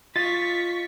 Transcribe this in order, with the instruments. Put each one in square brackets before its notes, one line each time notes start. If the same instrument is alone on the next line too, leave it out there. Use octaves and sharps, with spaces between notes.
[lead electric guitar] F4 D#5 [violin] C#6 B6 [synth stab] A6